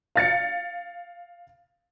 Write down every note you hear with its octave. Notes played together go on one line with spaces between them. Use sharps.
F5 A6 C#7